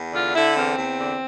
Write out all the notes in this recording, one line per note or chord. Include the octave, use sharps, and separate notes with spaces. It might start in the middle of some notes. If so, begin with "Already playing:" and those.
Already playing: E2
D3 F4
D3 E4
E2 C4
E2
D3